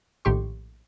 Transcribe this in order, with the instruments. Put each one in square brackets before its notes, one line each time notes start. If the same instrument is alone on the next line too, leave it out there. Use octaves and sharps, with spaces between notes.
[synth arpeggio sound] A#1 A2 D#3 G4 C6 C#6